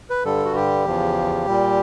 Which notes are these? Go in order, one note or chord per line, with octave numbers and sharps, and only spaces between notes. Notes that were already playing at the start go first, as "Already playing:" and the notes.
B4
G2 D3 G3 A4
F#4
G4
E2 C#3 F3
A#2 G3